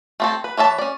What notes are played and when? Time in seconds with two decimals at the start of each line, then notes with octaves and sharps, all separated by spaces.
0.20 A3 C4 A4
0.44 B4
0.57 E3 C#5 E5 A5
0.78 C#4 D5